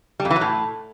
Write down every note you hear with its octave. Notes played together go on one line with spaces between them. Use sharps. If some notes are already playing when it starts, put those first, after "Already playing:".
G3
F2
E3
F#3
A2